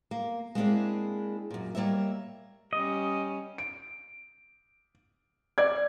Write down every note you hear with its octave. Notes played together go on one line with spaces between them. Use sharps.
A#3
G#3 A#3 C4 D4 E4 G#4
F#2 A#2
G3 A#3 C#5 D#5 E5
G3 C#4 D#5
D7
D5 G#6